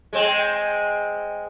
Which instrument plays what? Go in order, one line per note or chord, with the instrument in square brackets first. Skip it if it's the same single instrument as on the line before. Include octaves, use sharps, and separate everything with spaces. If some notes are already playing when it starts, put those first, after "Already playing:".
[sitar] G#3 C4